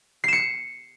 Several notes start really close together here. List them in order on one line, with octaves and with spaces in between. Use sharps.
C7 E7 C#7